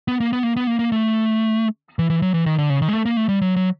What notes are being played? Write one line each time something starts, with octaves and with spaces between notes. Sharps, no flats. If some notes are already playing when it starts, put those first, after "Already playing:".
B3
A#3
B3
A#3
B3
A#3
A#3
A3
E3
E3
F#3
E3
D#3
D3
C#3
D#3
G#3
A3
A#3
A3
G3
F#3
F#3